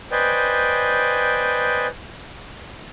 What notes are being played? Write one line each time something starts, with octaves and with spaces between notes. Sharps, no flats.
B4 C5 D5 D#5 G5 G#5